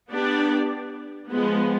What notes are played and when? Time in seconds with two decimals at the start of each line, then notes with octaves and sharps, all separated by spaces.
0.11 B3 D4 G4 D5
1.31 F3 G#3 B3